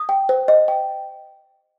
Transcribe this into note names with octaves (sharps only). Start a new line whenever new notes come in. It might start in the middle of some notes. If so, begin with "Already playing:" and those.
Already playing: D#6
G5
C5
D#5
G5